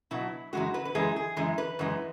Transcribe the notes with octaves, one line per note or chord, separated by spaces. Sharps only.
B2 F#3 E4
F#2 E3 G#3 F#4
B4
B4
F#2 E3 G#3 G#4
G#4
F#2 E3 G#3
B4
F#2 E3 G#3